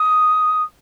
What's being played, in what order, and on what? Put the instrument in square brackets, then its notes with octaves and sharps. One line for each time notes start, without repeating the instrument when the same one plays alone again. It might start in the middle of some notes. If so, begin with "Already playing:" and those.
Already playing: [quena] D#6